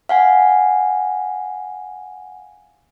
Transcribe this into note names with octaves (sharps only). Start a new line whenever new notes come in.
F5 F#5 G#5